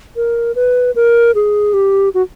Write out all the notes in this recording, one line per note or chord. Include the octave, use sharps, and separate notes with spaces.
A#4
B4
A#4
G#4
G4
F#4